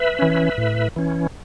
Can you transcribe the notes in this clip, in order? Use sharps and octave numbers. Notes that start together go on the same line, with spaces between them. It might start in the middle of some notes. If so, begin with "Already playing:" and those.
Already playing: B4 E5
E3 C#4
A2
E3 C#4